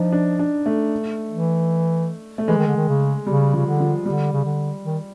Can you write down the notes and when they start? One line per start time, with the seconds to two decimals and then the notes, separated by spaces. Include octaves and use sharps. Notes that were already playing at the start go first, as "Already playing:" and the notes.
Already playing: F3 D4 D#4
0.12 D4
0.39 D4
0.66 A3
1.31 E3
2.38 A3
2.48 E3 G#3
2.58 D#3
2.67 D3
2.76 D#3
2.88 C#3
3.26 C#3 G3
3.53 C#3 F3
3.67 D3
3.80 F3
4.05 D3 G3
4.33 C#3
4.44 D3
4.85 D#3